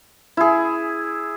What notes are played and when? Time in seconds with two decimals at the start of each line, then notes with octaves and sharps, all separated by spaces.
0.37 E4 G#4